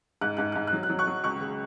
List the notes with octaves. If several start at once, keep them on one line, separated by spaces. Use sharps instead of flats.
G#2 F#6
G#2 F#6
F#6
G#2
F#6
F#3
F#6
F#3
C#6 F#6
F#3
C#2 C#6 F#6
C#3